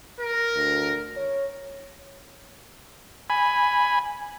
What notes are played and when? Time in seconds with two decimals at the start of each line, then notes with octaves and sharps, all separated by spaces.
0.20 A#4
0.56 D2
1.17 C#5
3.30 G#5 B5